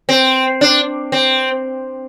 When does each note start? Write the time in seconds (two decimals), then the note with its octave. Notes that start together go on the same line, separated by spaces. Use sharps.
0.09 C4
0.61 D4
1.12 C4